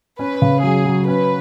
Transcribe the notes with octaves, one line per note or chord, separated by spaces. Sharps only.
C#4 B4
C#3
F#3 G#4
F#3
C#4 B4